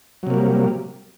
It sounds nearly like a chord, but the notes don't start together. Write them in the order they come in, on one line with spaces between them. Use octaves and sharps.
F#3 C3 A#3 G3